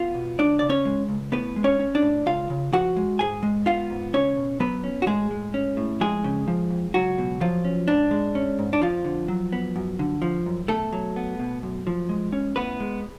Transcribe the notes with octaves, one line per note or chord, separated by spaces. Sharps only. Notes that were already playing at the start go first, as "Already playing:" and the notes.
Already playing: B3 F4 F5
B2
C#2 D4 D5
C#3 D5
C#4 C#5
G#3
C#2
A2 B3 B4
G#3
C#4 C#5
C#4
D4 D5
A2
C#2 F4 F5
C#3
F3 F#4 F#5
G#3
G#2 G#4 G#5
G#3
B3 F4 F5
G#2
C#2 C#4 C#5
B2
F#3 B3 B4
C#4
F#4
A2 G#3 G#4
G#3
C#4
A2
F2 G#3 G#4
C#3
F3
F2
C#2 F#3 F#4
B2
F3 F#3 F4
C#4
G#2 D4
G#3
C#4
G#2
D4
F2 F3 F4
D3
F#3
B3
F#2
D3
F3
F#2
B2 A3 A4
F#3
B3
B2
F#2
F3
G#3
C#4
A2 B3 B4
G#3